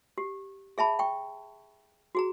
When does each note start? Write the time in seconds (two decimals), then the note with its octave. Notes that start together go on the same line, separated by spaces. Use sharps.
0.18 G4
0.78 G#4 E5 A5 B5
0.99 G5 C#6
2.15 F#4 G#4 A#5